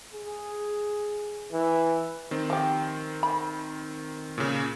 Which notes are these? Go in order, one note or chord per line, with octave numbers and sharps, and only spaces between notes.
G#4
E3
D#3 C4
F3 G4
B5
A#2 C#3